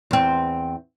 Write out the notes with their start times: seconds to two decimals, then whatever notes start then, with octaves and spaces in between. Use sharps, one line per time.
0.11 E2 C4